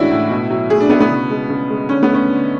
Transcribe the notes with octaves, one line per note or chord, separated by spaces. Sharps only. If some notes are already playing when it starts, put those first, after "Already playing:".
Already playing: A2 E3 G#3 C#4 D4 E4 F#4
A2
B2
F#3
A3 G#4
D4
B2 B3
B3
C#3
G#3
C#3
G#3
D3 C#4
B3
A3
C#4
D3